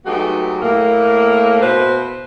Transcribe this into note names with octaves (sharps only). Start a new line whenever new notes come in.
F#3 G#3 A3 B3 D#4 G4
A2 A#3
B2 E4 B4 C5